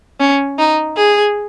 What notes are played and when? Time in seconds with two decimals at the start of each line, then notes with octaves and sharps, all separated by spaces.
0.20 C#4
0.58 D#4
0.97 G#4